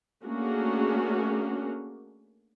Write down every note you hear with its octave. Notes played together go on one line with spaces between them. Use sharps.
A3 A#3 C#4 D4 F#4 G#4